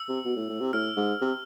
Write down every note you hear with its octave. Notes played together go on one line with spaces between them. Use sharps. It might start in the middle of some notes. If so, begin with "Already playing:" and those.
Already playing: E6
C3
B2
A2
A2
C3
A2 F6
G#2
C3